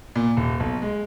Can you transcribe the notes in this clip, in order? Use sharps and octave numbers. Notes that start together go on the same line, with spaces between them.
A#2
D#1
B1
G#3